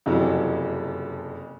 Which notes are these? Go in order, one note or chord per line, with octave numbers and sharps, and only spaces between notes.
F#1 F2 C3 E3 F#3